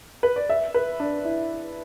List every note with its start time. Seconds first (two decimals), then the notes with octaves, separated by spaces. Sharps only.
0.23 B4
0.36 D5
0.49 E5
0.74 B4
1.00 D4
1.25 E4